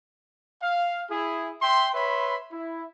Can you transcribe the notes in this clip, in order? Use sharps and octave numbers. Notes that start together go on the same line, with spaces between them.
F5
E4 G#4
E5 G5 C6
B4 C#5 E5 B5 C6
E4